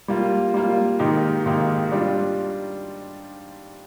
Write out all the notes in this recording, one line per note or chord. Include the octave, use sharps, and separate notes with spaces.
G3 A#3 F4
G3 A#3 F4
G#2 D#3 A#3 D#4 G4
G#2 D#3 A#3 D#4 G4
G3 D4 F4